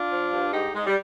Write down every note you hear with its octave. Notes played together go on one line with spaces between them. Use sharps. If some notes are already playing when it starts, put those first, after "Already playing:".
Already playing: D4 F4
F3
G2
G#2 D#4 G4
G#2 G#3
G3